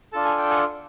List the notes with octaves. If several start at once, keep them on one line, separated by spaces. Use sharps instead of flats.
D4 F4 A4 A5
G#5
G5
F#5 G#5